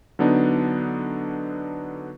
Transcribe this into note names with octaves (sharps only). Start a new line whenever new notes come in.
D3 F#3 B3 D4 D#4